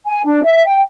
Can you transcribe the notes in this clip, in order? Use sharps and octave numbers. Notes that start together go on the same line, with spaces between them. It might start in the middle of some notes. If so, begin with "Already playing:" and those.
G#5
D4
E5
G5